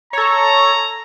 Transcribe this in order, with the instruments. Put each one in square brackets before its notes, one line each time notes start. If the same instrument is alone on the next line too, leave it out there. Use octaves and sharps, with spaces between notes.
[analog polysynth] A4 C#5 [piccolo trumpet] A#5